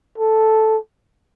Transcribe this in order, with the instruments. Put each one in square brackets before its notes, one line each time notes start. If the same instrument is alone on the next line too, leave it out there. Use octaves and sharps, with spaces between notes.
[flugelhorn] A4